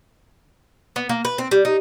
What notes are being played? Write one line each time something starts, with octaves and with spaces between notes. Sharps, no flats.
B3
A#3
B4
C4
G3
D#4